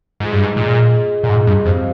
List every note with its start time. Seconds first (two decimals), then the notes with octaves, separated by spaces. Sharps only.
0.20 G#2 F4 G#4 D#5
0.32 G2
0.43 G#2
0.57 A#2 F4 G#4 D#5
0.93 F4 G#4 D#5
1.23 A#2
1.29 G#2 F4 G#4 D#5
1.47 G2
1.65 F2 C4 G4 C5 F5